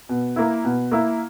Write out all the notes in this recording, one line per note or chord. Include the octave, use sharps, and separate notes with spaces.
B2
A#3 E4
B2
A#3 E4